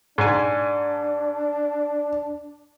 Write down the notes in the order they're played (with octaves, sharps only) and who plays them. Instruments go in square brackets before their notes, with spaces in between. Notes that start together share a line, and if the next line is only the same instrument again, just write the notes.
[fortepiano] G#2 G#5 [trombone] D4